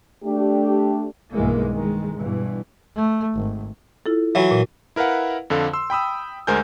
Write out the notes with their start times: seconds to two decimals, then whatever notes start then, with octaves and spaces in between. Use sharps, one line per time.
0.24 A3 D4 G4
1.35 B1 G2 D#3 E3 G#3 A#3
1.73 D#3 G#3
2.17 G2 B2 E3
2.96 A3
3.36 G#1
4.06 E4 F4 A4
4.35 E3 F#3
4.51 A#2
4.96 E4 A#4 B4 F5 F#5
5.50 F2 D3 A4 F5
5.73 C6 E6
5.90 G5 B5 D#6 E6
6.47 D2 G#3 A#4 C5 G#5 G6